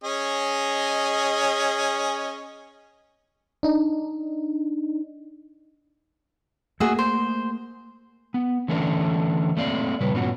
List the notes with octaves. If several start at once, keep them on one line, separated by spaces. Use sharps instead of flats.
C#4 G#4 D#5
D4 D#4
A3 A#3 F#4 G#4 E5
C5
B3
D3 E3 A3 C#4 D4 A#4
A3 A#3 C4 D5 F5
A#2 C#3 G3 B4
G2 A#2 B3 C#4 F4 F#4